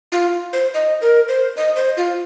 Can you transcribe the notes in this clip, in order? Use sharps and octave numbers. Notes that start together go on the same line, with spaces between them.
F4
C5
D#5
A#4
C5
D#5
C5
F4